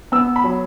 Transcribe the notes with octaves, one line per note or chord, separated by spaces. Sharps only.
B3 E6
B5
F#3